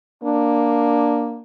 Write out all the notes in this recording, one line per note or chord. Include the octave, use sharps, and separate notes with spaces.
A#3 D4